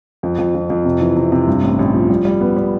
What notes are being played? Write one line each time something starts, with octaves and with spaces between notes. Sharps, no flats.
F2
F2
F2
F2
C3
E3
C3
C3
G2
A1
A1
F3
G3
G3
B3
G3